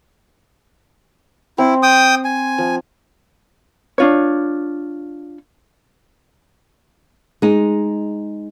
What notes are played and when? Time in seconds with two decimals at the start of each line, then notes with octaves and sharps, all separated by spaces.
1.58 C4 E4
1.83 G5 D#6
2.25 G#5
2.58 F3
3.98 D4 F4 C#5
7.42 G#3 D#4